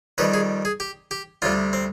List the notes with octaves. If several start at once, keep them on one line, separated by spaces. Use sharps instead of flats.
F2 D#3 G3 B4
G#4
G#4
G4
G4
D2 C3 G3 F4
C4